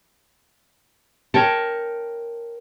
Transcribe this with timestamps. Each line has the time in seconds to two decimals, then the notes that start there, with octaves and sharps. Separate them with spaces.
1.34 A#4 C#5 G5 A5